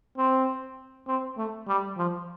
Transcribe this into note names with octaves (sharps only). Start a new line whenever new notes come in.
C4
C4
A3
G3
F3